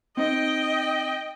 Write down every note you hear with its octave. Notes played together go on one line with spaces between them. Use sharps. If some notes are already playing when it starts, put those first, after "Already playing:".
C4 D#4 D#5 G5